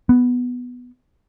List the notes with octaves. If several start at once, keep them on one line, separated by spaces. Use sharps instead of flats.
B3